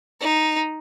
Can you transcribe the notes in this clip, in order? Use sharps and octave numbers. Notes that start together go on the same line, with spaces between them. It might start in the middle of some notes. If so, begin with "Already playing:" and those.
D#4